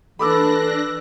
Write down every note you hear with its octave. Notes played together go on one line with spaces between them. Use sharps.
E3 D4 A4 B5 D6 E6 F#6 A#6